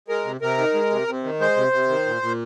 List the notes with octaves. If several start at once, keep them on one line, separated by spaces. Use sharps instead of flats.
G#3 A#4
C3
C3 A#4
D#3
G#3
C3
C3
D#3
G#3 C5
C3
C3
D#3
A#2
A#2